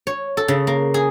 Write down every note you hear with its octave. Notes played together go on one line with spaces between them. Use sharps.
C#5
A4
C#3
A#3
G#4